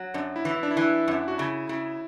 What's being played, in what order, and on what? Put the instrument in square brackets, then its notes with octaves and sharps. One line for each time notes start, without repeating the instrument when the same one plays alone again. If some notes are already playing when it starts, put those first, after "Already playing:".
Already playing: [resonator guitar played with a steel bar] F#3
[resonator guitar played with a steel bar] F#2 [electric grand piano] D4
[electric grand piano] E4
[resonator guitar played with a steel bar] E3
[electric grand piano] E4
D4
E4
[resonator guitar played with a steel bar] E3
F#2
[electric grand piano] F#4
[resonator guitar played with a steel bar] C#3 [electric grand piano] E4
[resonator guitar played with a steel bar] C#3 [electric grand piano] E4